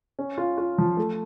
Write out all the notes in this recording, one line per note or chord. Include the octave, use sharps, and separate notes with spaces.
C#4
F4
F4
F3
A3